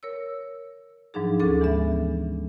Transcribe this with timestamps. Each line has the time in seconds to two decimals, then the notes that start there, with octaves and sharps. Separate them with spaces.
0.03 A#4 C#5 E6
1.14 G#2 F3 F#3 D4 D#4 G#4
1.39 D2 C#4 A4 D6 A6
1.61 E3 G#3 B3 E5